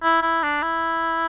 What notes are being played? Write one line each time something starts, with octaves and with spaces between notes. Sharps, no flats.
E4
E4
D4
E4